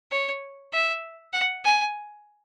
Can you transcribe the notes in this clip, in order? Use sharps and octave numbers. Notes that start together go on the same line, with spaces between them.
C#5
E5
F#5
G#5